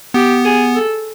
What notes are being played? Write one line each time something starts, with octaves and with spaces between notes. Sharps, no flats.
B3 G4
G#4
A4